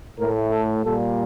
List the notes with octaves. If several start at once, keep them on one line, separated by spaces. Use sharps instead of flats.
A2 A3 A#4
A4
A#2 G3 A#3 A4